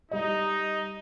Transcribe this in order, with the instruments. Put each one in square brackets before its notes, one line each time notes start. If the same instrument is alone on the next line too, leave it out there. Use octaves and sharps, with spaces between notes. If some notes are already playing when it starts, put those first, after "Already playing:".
[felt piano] G3 D#5 [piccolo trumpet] D#4